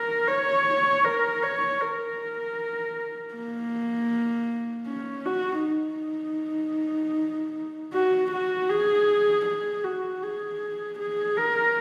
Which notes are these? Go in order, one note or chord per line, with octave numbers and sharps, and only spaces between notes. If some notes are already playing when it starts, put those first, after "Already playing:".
Already playing: A#4
C#5
A#4
C#5
A#4
A#3
C#4
F#4
D#4
F#4
F#4
G#4
G#4
F#4
G#4
G#4
A#4